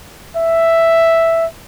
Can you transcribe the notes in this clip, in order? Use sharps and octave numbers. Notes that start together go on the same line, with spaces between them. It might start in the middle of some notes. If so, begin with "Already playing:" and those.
E5